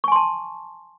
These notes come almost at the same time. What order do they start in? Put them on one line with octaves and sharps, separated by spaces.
C#6 G#5 C6 A5